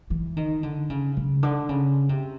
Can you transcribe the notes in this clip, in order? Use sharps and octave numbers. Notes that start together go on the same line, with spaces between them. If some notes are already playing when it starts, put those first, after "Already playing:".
E3
D#3
D3
C#3
C#3
D3
C#3
C3